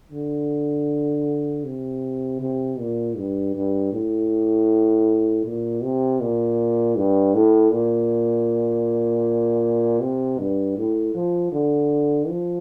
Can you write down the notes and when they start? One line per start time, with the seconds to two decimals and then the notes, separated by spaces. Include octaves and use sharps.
0.12 D3
1.64 C3
2.40 C3
2.79 A#2
3.17 G2
3.55 G2
3.93 A2
5.45 A#2
5.83 C3
6.21 A#2
6.97 G2
7.35 A2
7.72 A#2
10.00 C3
10.39 G2
10.77 A2
11.15 F3
11.52 D3
12.29 F3